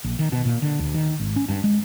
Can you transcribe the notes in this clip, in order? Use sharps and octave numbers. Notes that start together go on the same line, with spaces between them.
A#1
D#3
B2
A#2
D3
D2
D#3
G#1
C#4
G2
G#3